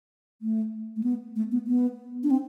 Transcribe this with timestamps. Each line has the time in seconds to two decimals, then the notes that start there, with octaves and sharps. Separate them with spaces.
0.41 A3
0.96 A3
1.03 B3
1.36 A3
1.51 B3
1.67 B3
2.23 D4
2.30 C4